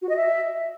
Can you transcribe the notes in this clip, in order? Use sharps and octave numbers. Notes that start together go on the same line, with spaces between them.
F#4
D#5
E5